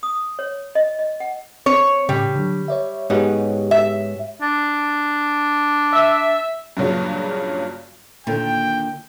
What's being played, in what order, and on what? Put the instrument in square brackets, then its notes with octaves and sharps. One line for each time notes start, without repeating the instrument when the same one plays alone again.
[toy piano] D#6
C#5
D#5
D#5
F#5
[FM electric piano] C4 [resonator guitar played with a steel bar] C#5
[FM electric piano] A2 C#3 [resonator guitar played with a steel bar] G3
[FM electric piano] D3 F#3
C#5 D5 E5
[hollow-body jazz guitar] G#2 B3 D#4 [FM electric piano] F#4 G4 C#5
[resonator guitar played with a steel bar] E5
[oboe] D4
[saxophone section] E5
[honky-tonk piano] G2 A#2 C#3 F#3
[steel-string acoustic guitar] D#2 A#2 D3 [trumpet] G5